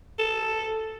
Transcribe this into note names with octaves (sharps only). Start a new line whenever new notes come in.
A4